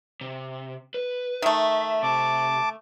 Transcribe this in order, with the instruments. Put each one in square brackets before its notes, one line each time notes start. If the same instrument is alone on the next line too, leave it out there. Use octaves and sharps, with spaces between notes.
[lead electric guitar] C3
B4
[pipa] D#3 A3 [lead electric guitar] E5
[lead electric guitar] C3 [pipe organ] A5 D6